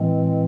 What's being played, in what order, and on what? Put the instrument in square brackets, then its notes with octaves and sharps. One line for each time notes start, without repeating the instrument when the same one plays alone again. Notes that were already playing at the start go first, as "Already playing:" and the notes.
Already playing: [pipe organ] A2 E3 G#3 C4